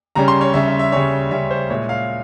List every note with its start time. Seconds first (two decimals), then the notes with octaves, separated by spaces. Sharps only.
0.16 C#3 G3 C#4 A#5
0.28 C6
0.41 C#5
0.54 C#3 G3 C#4 E5
0.68 E5
0.79 E5
0.92 C#3 G3 C#4 C#5
1.31 C#3 G3 C#4 E5
1.51 C5
1.70 A#2 G#3 E4 C#5
1.89 F5